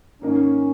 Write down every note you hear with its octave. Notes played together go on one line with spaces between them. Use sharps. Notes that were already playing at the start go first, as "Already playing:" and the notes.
G#2 D#3 A#3 C#4 D#4 A#4